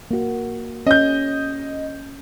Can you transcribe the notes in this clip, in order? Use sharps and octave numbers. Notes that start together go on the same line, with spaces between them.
A#3 F#4
C#4 D#5 G6